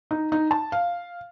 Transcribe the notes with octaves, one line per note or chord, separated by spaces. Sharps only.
D#4
D#4
A5
F5